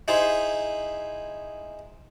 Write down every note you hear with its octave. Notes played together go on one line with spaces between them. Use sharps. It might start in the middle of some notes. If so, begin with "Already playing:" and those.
D#4 E4 G#4 C5